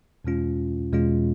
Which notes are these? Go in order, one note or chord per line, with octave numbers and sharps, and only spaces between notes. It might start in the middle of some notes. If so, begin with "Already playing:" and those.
E2 B2 G#3 C#4 F4
E2 B2 G#3 C#4 F4